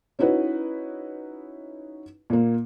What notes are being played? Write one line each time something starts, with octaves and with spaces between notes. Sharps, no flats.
C#4 D#4 E4 F#4 B4
A#2 A#3